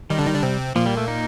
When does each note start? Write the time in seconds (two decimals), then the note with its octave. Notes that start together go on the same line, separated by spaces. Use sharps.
0.10 D#3 G3 D#4
0.18 D3 D4
0.26 D#3 D#4
0.34 D3 D4
0.43 C3 C4
0.75 A#2 F3 A#3
0.86 G3
0.97 A3
1.08 D#4